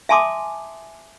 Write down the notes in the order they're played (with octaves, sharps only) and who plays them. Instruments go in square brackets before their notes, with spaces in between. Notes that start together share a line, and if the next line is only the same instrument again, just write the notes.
[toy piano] E5 G#5 A5 C6 D6 D#6